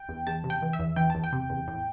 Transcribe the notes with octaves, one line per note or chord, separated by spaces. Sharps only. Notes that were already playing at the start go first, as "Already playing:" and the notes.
Already playing: G5
E2
E2 A5
C3
G5
E3
E5
E2
E3 G5
E2 A5
G5
C3
E2
A2